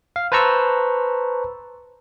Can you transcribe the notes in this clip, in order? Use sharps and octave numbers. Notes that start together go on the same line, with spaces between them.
F5
B4 C5 A5 A#5 C#6 E6